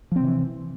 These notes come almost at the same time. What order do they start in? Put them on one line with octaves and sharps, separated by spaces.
F3 C4 C3 E3